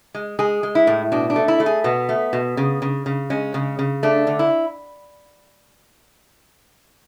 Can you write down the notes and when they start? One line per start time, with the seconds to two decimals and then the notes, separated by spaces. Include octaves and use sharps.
0.15 G#3
0.39 G#3 G#4
0.63 G#3
0.75 E4
0.87 A2
1.12 B2 D4
1.30 D4
1.36 A3
1.48 E4
1.60 A3
1.66 G#4
1.84 B2 B3
2.09 A3
2.33 B2
2.57 C#3
2.82 C#3
3.06 C#3
3.30 G#3 C#4
3.54 C#3
3.79 C#3
4.03 A3 D4
4.27 D3
4.39 E4